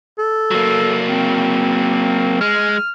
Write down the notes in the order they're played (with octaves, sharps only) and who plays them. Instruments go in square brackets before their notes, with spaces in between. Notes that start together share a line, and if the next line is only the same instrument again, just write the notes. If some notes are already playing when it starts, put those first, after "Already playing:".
[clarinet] A4
[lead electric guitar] F#3 A#3
[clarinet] C4
[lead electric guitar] G#3 [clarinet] F6